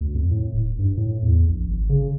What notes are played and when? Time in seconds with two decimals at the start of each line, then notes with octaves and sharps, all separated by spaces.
0.01 D2
0.15 F2
0.31 A2
0.53 D#1
0.79 G2
0.97 A2
1.23 E2
1.49 A#1
1.67 G#1
1.89 C#3